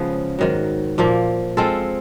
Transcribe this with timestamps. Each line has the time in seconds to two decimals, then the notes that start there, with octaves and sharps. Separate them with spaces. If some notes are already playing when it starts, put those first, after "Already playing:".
Already playing: C#3 F3 G#3 B3
0.39 G#2 D#3 F#3
0.98 A#2 F3 A#3
1.57 G#3 C4 F4 A4